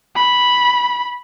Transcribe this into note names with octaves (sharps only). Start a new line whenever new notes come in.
B5